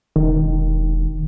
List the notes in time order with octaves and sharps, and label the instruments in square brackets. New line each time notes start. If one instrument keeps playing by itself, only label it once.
[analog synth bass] E1 [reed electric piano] D#3